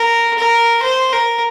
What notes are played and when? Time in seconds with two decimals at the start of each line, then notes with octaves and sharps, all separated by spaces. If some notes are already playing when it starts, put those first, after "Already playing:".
Already playing: A#4
0.38 A#4
0.83 C5
1.13 A#4